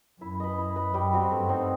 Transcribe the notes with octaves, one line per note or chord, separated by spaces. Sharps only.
F#2 E4
B4 D#5
E4
B4 D#5
F#2 G3
C4 F#4
G2 A3
C4 D#4